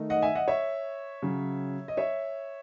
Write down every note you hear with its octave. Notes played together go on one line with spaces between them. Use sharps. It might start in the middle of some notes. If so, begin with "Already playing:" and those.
Already playing: D#3 A3 D#4
D#5 F#5
E5 G#5
D#5 F#5
C#5 E5
C#3 F#3 C#4
D#5
C#5 E5